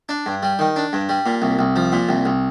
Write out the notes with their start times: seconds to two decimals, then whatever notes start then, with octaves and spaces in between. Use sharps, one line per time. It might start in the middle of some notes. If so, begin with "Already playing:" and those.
0.09 D4
0.26 G2
0.43 G3
0.59 D#3
0.76 D4
0.93 G2
1.09 G3
1.26 A#2
1.42 C2
1.59 C2
1.76 F3
1.92 A#2
2.09 C2
2.25 C2